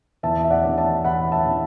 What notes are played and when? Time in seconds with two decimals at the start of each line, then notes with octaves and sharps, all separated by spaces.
0.23 E2 E5 A5
0.44 E5
0.51 D5 F#5
0.64 E3 D4
0.78 E5 A5
1.05 E2 F#5 B5
1.32 E5 A5
1.46 E3 D4